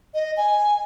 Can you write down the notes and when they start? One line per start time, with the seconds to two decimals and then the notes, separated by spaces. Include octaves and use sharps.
0.14 D#5
0.37 G#5